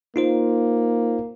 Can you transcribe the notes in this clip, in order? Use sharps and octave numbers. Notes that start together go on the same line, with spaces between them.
A#3 D#4 F4 C5